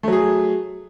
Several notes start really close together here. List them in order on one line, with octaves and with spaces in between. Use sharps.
A3 F#3 G#4